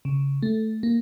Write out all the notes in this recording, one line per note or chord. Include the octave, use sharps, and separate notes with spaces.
C#3
A3
A#3